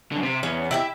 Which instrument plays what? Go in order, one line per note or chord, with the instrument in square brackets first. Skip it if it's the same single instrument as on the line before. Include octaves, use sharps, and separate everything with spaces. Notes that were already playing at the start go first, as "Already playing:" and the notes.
[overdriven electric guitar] F#2 D3
C3
[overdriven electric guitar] E2 [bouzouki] C#4
[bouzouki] E4 G4 E5